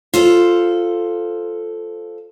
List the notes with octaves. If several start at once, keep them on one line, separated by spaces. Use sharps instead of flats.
F4 A4 C5